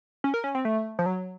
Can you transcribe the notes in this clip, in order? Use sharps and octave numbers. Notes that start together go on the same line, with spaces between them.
C#4
A#4
C#4
C4
A3
F3
F#3